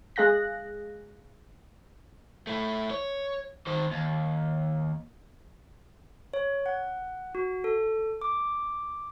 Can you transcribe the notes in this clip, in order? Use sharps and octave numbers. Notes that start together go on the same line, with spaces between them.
G#3 G#4 F5 F#6 A#6
A3 E4
C#5
D#3 C5
D#2
C#5
F#5
F#4
A4
D6